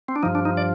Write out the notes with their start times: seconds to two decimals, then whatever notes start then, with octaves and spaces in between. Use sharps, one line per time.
0.08 C4
0.16 D4
0.23 G2 F3 D#4
0.35 D4
0.45 D#4
0.57 D5